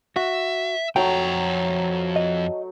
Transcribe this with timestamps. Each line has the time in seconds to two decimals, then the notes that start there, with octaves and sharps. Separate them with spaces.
0.16 F#4 E5
0.96 F2 F#3 A3 D#4 G5 A#5
2.16 D#5